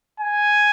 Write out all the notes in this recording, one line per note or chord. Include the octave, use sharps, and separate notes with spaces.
G#5